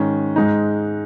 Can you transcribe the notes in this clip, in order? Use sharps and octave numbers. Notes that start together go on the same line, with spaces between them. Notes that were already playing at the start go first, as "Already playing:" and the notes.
Already playing: G#2 D#3 C#4
G#2 G#3 D#4